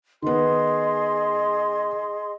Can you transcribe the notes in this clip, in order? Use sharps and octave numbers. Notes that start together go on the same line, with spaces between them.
D#3 B3 G#4 D#5 C6